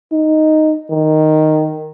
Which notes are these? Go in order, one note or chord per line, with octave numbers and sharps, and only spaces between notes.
D#4
D#3